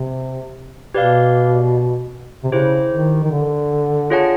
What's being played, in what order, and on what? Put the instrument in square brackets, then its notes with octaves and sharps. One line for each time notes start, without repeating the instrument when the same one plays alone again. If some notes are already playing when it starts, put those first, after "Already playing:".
Already playing: [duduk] C3
[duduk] B2 [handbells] G4 B4 D5 F5
[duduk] C3
[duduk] C#3 [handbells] E4 G4 C5
[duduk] D#3
D#3
D3
[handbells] F4 G#4 C#5 F#5 A5